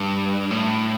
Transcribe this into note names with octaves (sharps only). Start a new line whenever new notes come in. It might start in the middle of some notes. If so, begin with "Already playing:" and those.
Already playing: G2
A2